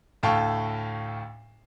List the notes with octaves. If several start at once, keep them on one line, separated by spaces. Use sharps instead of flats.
D2 A2 F5 G5 A5 C#6